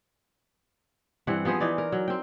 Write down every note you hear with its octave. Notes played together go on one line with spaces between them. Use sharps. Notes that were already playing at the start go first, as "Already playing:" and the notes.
G2 E3 C4 F#5
F3 B3 G#4 C5
E3 D#4 D5
A#4
F#3
C4 G5